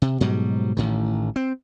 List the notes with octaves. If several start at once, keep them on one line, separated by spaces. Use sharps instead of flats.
C3
G#2 B2 F#3 G3
A1 A2 D#3
C4